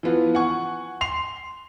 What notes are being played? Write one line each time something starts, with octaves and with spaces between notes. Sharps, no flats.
E3 F3 B3 F4
F#5 G#5 C#6
C6 C7 F7